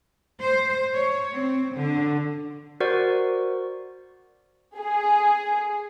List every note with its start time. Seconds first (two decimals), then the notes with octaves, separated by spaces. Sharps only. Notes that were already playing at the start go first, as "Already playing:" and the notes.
0.40 C5
0.94 C#5
1.33 C4
1.76 D3
2.80 F#4 A#4 C5 D5 F#5 C#6
4.76 G#4